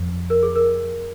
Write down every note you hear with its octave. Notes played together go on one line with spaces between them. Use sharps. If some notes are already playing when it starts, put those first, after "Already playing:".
Already playing: F2
A#4
G#4
A#4